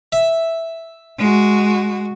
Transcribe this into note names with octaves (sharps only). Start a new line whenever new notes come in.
E5
G#3 F#4